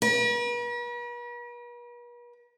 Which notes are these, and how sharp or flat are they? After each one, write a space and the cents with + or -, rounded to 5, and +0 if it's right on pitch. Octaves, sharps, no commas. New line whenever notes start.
B4 -45